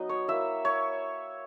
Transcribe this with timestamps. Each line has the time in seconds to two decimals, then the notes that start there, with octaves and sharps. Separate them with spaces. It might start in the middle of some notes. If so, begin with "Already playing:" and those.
Already playing: F#3 B3 D#4 D#5
0.09 C#5
0.28 A#3 E4 E5
0.65 C#5